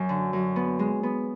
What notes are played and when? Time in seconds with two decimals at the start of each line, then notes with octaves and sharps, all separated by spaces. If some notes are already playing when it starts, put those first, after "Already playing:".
Already playing: F#2
0.09 D3
0.33 F#2
0.56 B3
0.79 G#3
1.03 B3